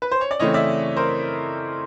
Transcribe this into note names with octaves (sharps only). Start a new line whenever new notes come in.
B4
C5
C#5
D5
C#3 E3 A3 C4 C#5 D#5
D5 E5
A#4 C5